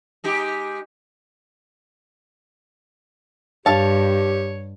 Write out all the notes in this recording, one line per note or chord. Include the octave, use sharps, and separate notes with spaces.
G#3 D#4 G4
G2 G4 C#5 F5 A5